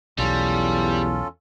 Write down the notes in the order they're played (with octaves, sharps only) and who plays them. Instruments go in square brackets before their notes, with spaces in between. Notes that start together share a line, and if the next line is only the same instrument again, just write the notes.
[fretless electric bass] B1 [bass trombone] E2 [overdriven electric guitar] G3 [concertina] C#4 F4 A4